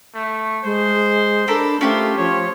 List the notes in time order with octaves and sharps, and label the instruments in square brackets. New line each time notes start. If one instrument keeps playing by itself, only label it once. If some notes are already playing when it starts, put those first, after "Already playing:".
[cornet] A3
[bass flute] G#3 [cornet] C5
[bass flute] D4 [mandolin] A4 A#4 B5
[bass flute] A3 [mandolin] C#4 G4 C5 [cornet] F4
[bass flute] F3 [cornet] C#5